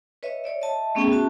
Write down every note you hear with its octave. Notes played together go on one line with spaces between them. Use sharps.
B4 C#5 D#5 E5
C#5 D5 E5
D#5 E5 A5
A3 B3 C#4 G#4 E5 G5
C#4 F#4 E5 A5